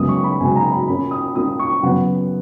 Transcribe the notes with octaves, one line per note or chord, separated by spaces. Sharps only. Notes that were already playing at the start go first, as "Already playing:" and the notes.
Already playing: F#2 C#3 G#3 B3 D#6
C#6
B5
F#2 C#3 G#3 B3 G#5
A#5
B5
A#2 A#3 C#4 B5
D#6
A#2 A#3 C#4 D#6
C#6
F#2 C#3 F#3 B3 F#5